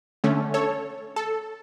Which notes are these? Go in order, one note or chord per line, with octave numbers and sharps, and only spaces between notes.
D3 A3 C#4
A4 C#5
A4